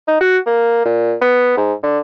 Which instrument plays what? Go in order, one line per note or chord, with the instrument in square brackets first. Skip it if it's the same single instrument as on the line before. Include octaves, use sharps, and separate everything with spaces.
[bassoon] D#4
F#4
A#3
A#2
B3
G#2
D3